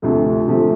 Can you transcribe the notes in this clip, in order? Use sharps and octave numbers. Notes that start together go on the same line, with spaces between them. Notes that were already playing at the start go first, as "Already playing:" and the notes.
D2 C3 F3 A3
D2 C3 F3 A3